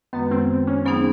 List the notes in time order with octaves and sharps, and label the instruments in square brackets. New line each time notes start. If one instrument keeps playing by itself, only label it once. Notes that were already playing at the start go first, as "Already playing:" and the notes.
[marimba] F#2 D#3 G#3 [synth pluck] B3
[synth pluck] C4
C#4
[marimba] F#3 B3 D#4 G#4 [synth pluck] C4